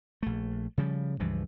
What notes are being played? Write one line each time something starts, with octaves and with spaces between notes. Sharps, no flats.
A#1 A3
C#3 F3 G3
C#2 G2 E3 F3